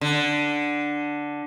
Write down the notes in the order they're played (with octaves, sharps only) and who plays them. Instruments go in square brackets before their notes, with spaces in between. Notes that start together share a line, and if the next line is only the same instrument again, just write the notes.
[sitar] D3